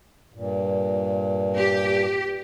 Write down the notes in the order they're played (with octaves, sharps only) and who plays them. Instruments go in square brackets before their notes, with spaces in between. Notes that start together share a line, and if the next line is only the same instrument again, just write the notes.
[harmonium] G2 A#2
[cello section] G4